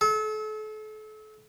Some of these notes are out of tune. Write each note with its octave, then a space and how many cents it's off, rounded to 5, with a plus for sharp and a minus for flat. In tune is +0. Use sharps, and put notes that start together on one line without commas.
A4 -35